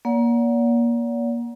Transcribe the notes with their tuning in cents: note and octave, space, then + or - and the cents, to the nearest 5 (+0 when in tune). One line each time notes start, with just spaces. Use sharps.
A#3 +25 D5 -45 F#5 -10